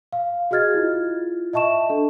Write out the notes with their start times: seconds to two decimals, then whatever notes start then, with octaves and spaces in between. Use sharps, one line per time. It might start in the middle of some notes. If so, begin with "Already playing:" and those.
0.13 F5
0.51 F#4 G#4 D#5 F6 G#6 A6
0.74 E4 F4
1.53 D#5 E5 A5 C#6 E7
1.89 D4 A4